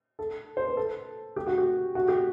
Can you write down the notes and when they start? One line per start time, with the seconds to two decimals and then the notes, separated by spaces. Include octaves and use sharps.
0.19 A4
0.57 C5
0.68 B4
0.77 A4
1.36 G4
1.47 F#4
1.58 G4
1.95 F#4
2.08 G4